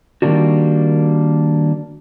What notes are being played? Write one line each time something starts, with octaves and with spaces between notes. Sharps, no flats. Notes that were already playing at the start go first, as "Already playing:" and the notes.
D#3 G3 A#3 D4 F#4